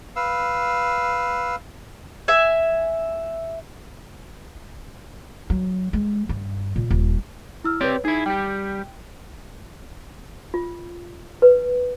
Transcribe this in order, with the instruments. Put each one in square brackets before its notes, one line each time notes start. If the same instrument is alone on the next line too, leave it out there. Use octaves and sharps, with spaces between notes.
[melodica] B4 F5 E6
[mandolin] E5 G#5
[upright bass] F#3
G#3
G2
A#2
D#1
[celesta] E4 E6 F6
[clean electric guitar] C4 G4 D5 [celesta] B4 C#5
[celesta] D#4 [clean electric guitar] E4 G#4
[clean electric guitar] G3 G4 [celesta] G5
[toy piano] F4
B4